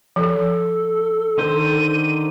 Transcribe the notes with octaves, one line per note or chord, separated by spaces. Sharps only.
F3 A4
D3 D#3 C5 D#7